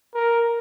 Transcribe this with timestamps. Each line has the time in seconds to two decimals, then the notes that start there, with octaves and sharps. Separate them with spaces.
0.15 A#4